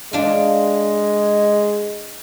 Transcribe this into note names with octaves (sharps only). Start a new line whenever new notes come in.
G#3 D4 F4